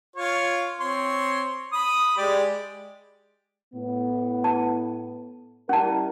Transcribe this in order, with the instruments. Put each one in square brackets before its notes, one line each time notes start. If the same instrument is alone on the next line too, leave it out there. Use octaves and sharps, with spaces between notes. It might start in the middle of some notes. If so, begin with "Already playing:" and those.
[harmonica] F4 C#5
C4 C#5 C6
B5 D#6
G#3 G4 D5
[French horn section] A2 B3
[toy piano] A5
[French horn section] G3 E4 A#4 [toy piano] C#4 A5